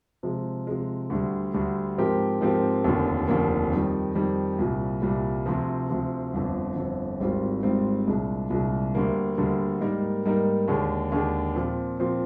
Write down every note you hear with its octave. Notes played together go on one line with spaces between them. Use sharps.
C3 F3 G#3
C3 F3 G#3
D2 D3 G3
D2 D3 G3
G#2 F3 C4 G4 A#4
G#2 F3 C4 G4 A#4
F1 D#2 D3 F3 A#3
F1 D#2 D3 F3 A#3
F2 D#3 G3
F2 D#3 G3
C2 A#2 G3
C2 A#2 G3
D2 C3 F3
D2 C3 F3
G1 F2 D3
G1 F2 D3
G#1 G#2 G3 C4 F4
G#1 G#2 G3 C4 F4
C2 A#2 G#3 D4
C2 A#2 G#3 D4
D2 D3 G3 A#3
D2 D3 G3 A#3
G#2 G3 A#3 D#4 A#4
G#2 G3 A#3 D#4 A#4
D#2 D3 G#3 D4
D#2 D3 G#3 D4
A#2 F3 C4
A#2 F3 C4